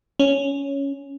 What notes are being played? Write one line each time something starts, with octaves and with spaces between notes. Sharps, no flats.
C#4